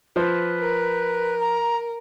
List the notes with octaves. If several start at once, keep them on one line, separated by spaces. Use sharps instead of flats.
F3 B4 C5
A#4
A#5